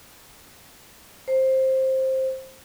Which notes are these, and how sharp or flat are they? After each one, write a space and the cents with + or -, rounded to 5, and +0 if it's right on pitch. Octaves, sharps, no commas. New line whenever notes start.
C5 +10